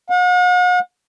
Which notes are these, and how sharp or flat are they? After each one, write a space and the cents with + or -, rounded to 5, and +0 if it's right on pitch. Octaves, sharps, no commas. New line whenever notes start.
F#5 -45